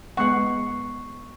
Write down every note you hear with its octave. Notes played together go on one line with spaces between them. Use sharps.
G#3 B3 F#5 C#6 C7